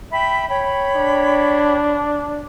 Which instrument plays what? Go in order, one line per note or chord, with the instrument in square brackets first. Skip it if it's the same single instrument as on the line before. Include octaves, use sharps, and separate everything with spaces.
[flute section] E5 G5 B5
C#5 G5 B5
[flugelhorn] D4